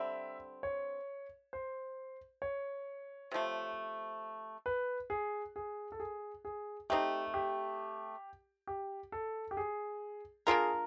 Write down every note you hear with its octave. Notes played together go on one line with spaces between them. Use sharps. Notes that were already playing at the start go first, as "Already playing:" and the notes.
Already playing: D3 G3 C4 E5
C#5
C5
C#5
C3 F3 A3
B4
G#4
G#4
A4
G#4
G#4
A3 C4 D#4 G4
G4
G4
A4
G4
G#4
A#3 D4 F4 G#4 A#4